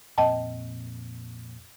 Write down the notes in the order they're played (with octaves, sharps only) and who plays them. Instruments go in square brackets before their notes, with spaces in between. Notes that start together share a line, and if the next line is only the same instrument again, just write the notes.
[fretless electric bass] F2 A#2 C4 [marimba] D#5 G5 A5